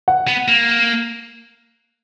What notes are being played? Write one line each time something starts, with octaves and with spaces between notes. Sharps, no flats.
F#5
B3
A#3